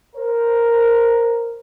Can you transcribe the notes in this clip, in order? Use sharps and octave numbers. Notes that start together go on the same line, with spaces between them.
A#4 C5